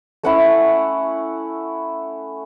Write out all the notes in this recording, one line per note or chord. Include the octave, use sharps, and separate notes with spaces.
A3 C#4 E4 F#5